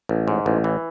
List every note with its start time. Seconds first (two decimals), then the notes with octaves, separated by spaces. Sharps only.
0.09 A1
0.28 G#2
0.46 A1
0.64 E3